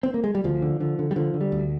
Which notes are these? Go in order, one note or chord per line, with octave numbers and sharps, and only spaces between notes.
C4
A#3
G#3
G3
D2 F3
D3
D3 F3
D3
G3
D3 F3
D3
G3
D2